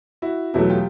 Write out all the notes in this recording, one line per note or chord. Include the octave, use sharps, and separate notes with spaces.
E4 F#4
E2 B2 F#3 A3 E4 F#4
F4 G4